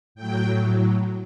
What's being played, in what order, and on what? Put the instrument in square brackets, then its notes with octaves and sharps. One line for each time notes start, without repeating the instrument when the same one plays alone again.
[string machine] A2 F#3 G5